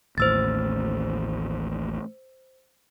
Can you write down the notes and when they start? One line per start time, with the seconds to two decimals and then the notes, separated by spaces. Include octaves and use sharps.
0.18 A1 D#2 A2 C5 E6 A6